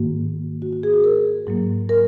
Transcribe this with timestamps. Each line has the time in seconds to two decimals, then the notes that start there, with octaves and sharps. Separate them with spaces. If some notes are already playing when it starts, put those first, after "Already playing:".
Already playing: G#2 D#3 A#3 F#4
0.62 F#4
0.73 F#4
0.83 G#4
0.94 F#4
1.04 A#4
1.47 G#2 F#3 A#3
1.89 A#4